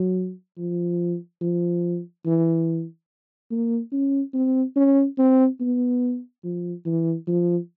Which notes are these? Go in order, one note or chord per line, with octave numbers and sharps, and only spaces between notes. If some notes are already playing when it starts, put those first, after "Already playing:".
Already playing: F#3
F3
F3
E3
A#3
C#4
C4
C#4
C4
B3
F3
E3
F3